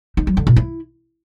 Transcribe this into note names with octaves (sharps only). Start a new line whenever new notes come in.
D#4
F#3
D3
A#2
E4